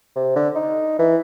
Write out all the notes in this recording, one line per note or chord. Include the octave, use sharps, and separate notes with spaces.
C3
D3
D#4
E3